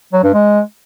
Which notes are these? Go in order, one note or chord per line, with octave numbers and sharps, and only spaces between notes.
F#3
G2
G#3